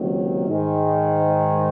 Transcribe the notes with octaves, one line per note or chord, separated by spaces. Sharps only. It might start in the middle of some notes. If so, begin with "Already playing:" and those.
Already playing: C#2 C3 D#3 F#3 A#3
G#2 D#3 G#3